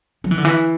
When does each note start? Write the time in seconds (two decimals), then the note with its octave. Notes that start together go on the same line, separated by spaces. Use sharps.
0.24 F#3
0.31 E3
0.38 D3
0.45 E3